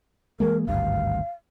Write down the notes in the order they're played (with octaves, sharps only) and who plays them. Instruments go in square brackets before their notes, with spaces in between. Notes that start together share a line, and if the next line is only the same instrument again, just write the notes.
[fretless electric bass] E3 G#3 A#3 [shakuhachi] A#4
[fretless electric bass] G#1 D2 G2 [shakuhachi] F5